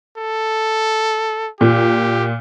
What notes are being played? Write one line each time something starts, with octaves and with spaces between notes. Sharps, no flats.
A4
A#2 G4